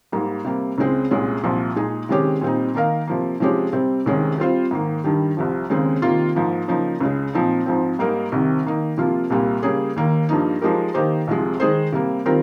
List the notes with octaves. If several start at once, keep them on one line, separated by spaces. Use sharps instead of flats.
G#2 G3 A#3
C3 G3 A#3
C#2 C#3 G#3 C4
C2 A#2 G#3 C#4
C2 A#2 F3
A#2 G#3 D#4 G#4
C3 D#3 G#3 C#4 G4
A#2 G3 C4 D#4
D#3 A#3 D#4 A#4 F5
C3 F3 A#3
C3 F3 G#3 C#4 G4
C3 G3 C4
C2 C3 D#3 G#3 C#4
G3 C4 F4 C5
G#2 D#3 A#3
G2 D#3 G3
C2 C3 F3
D#2 C#3 G#3 C4
C3 D#3 A#3 F4
G#2 F3 A#3
C#3 F3 A#3 D#4
C#2 C#3 G#3
A#2 F3 C4 D#4
G#2 F3 C4
G#2 G3 A#3 D#4 A#4
C2 C3 D#3
D#3 A#3 D#4
C3 F3 A#3 F4
C2 A#2 G3 A#3
C#3 G3 A#3 C#4 G#4
D#2 D#3 A#3
G2 F3 A#3 D#4
F3 G#3 D#4 G4 A#4
D#3 A#3 D#4 G4 C5
C2 C3 F3 G#3
D#3 G#3 D#4 G#4 C5
C3 G3 A#3
D#3 G3 C4 F4 A#4